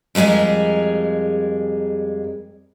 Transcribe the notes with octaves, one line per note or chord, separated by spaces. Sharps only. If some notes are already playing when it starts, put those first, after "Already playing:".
F2 G3 G#3 G#4 A#4